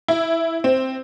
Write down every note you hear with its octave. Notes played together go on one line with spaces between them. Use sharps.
E4
C4